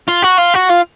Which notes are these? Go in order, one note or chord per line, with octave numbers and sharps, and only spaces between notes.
F4
F#4
F4
F#4
F4